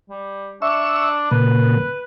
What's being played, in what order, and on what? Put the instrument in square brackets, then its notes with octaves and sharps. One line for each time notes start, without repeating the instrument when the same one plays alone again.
[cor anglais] G3
[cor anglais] D4 [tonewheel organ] E5 C#6 E6
[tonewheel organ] A#2 C#3 A#3 [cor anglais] B4